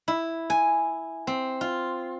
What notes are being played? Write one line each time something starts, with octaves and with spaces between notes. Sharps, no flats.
E4
G#5
C4
F4